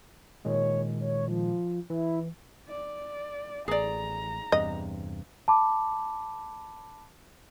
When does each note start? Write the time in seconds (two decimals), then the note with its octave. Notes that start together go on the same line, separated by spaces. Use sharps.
0.45 A#2 D#3 G#3 C#5
1.00 C#5
1.28 F3
1.90 E3 E4
2.68 D5
3.68 A1 G#4 D5 A#5
4.52 E2 G2 C3 D#5
5.48 A5 B5 D6